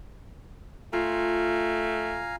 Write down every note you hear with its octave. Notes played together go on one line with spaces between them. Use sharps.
A3 F4 F5 G#5 A#5